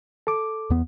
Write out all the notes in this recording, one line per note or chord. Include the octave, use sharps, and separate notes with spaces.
A4 D6
E2 B3